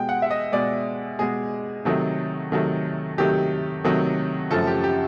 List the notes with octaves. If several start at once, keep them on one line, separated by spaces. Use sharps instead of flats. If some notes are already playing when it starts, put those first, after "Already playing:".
Already playing: B2 G#3 G5
F#5
E5
D#5
B2 G#3 D5
B2 G#3 G#4
C3 D#3 F#3 A3
C3 D#3 F#3 A3
C3 D#3 F#3 A3 G4
C3 D#3 F#3 A3
F#2 C#3 F3 A3 A4
G4
G4